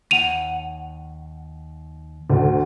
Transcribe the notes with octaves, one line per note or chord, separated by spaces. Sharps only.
D#2 F#5 D#7 F7
D2